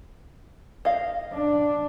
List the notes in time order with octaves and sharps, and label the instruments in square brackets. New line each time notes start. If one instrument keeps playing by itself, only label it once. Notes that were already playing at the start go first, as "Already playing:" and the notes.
[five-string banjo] D#5 F5
[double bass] D4